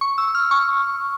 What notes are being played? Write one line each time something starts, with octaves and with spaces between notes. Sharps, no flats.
C#6
E6
F6
C#6